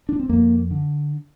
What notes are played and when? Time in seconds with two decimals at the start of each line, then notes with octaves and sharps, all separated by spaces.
0.09 D4
0.19 C4
0.29 F2 A#3
0.71 D3